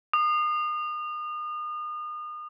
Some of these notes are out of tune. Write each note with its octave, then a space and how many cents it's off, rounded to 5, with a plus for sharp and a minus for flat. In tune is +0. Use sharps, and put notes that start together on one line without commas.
D#6 -35